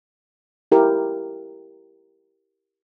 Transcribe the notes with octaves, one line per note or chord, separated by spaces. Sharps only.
E4 G4 A#4